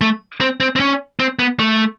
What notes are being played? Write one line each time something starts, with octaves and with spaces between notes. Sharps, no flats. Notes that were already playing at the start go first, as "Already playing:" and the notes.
A3
C4
C4
C4
C#4
C4
B3
A3